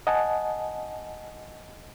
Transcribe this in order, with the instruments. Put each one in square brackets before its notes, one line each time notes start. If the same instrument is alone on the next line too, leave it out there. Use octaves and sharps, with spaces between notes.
[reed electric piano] D#5 F#5 G#5 A5